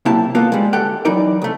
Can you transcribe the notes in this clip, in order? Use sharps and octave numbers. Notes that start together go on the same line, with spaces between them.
B1 C3 A#3 E4 G4 A5
A#3 B3 F4 A4
G3 G#3
D2 G4 A4 F#5 G5
E3 F#3 D#4 A#4 D5
C2 A3